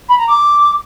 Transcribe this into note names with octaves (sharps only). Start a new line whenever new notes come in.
B5
A#5
D6